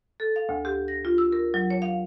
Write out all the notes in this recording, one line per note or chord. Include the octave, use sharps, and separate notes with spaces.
A4
F5
D2
G4
A#6
F4
E6
A#4
F#3
C#5
F5